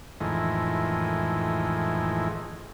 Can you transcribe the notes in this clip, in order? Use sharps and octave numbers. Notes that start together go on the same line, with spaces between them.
F2 A2 D#3 E3 G#3